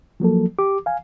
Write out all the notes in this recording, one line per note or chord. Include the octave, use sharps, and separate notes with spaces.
F3 F#3 A#3 A4
G4 D6
F5 G#5